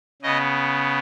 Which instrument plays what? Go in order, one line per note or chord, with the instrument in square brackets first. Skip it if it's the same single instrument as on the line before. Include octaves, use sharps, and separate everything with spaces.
[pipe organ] C#3 B3 D#5